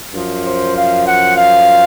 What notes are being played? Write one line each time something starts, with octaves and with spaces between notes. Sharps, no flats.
F#2 F3
C5
F5
F#5
F5